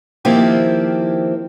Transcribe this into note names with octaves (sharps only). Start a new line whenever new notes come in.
D#3 F3 A#3 C4 E4 G4